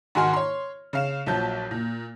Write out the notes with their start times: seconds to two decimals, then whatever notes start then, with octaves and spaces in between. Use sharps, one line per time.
0.15 G#2 D#3 F#4 G#5 C6 F6
0.33 C#5 C6
0.93 C#3 F5 E7
1.26 A#1 F3 F#3 A5 G6
1.71 A#2